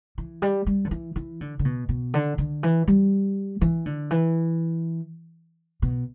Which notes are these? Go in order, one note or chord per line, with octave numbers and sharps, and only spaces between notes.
E3
G3
G3
D3
E3
E3
D3
D3
B2
B2
D3
D3
E3
G3
E3
D3
E3
B2